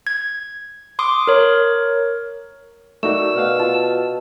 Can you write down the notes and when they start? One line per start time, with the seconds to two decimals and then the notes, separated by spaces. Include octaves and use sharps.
0.07 G#6
0.99 C6 D6 D#6
1.27 A#4 C#5
3.03 A3 D#4 F#4 A#4 D5 C#6 E6
3.36 B2 F5 F#5 F6
3.60 F4 A5